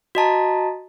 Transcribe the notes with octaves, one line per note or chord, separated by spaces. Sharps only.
F#4 D#5 A5 A#5